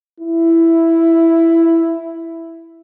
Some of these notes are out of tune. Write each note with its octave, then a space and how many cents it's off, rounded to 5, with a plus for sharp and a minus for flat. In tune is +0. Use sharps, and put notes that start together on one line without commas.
E4 +5